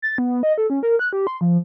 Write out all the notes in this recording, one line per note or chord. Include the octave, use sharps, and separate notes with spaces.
A6
B3
D#5
A4
C#4
A#4
F#6
G4
C6
F3